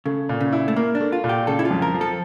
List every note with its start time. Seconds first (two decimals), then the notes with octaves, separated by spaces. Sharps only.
0.06 C#3 A3
0.29 A#2
0.41 C#3
0.52 E4
0.68 A3
0.76 A#3 A#4
0.95 D4
1.00 A3
1.12 F4
1.24 A#2
1.29 G4
1.47 C#3 A4
1.59 E4
1.65 F4
1.71 F2
1.82 A#4
1.94 F3
2.01 A4